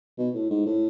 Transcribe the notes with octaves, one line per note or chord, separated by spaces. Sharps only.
B2
A2
G#2
A2